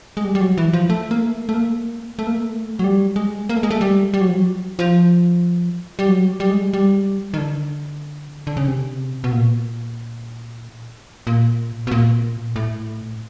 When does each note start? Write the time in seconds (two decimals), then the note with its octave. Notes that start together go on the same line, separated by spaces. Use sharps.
0.17 G#3
0.24 G3
0.35 G3
0.41 F#3
0.58 E3
0.73 F3
0.90 A3
1.11 A#3
1.22 A3
1.49 A3
1.54 A#3
2.19 A3
2.27 A#3
2.34 A3
2.79 F#3
2.84 G3
3.16 G#3
3.49 A#3
3.56 A3
3.63 G#3
3.71 A3
3.81 G3
4.14 G3
4.21 F#3
4.28 F3
4.36 F#3
4.79 F3
5.99 G3
6.08 F#3
6.40 G3
6.50 G#3
6.59 G3
6.73 G3
7.34 D#3
7.38 D3
8.47 D3
8.57 C#3
8.67 C3
9.24 B2
9.32 A#2
11.27 A#2
11.87 B2
11.91 A#2
12.56 A2